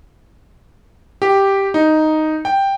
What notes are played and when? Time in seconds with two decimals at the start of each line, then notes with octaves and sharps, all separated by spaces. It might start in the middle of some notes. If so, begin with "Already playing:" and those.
1.22 G4
1.74 D#4
2.45 G5